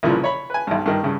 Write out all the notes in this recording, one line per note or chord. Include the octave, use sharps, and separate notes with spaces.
C2 A#2 C#3 E3 F3
C#5 B5
B4 G#5
B1 G2
G2 D#3
G2 C#3